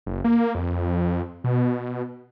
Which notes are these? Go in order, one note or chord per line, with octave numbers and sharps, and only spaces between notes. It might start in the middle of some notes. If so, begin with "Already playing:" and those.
F#1
A#3
F2
B2